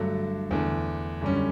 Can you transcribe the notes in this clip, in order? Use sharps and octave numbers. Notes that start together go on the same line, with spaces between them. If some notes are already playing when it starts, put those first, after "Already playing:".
Already playing: G2 D3 F#3 A3
E2 D3 A3
F#2 D3 G3 C#4